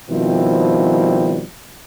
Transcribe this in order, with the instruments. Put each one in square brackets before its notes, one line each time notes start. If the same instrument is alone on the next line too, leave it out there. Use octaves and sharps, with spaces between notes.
[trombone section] B2 D#3 F3 G3 C4 E4